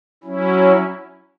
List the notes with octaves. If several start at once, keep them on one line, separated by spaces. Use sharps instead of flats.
F#3 C#4 E4